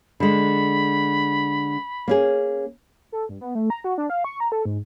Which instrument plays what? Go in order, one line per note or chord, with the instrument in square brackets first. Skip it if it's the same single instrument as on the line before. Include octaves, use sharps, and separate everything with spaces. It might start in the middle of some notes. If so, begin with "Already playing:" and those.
[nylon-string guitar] D3 G#3 [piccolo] B5
[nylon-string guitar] A#3 C#4 G#4
[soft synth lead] A4
G2
B3
A3
A#5
F#4
D4
F5
C#6
A#5
A4
G#2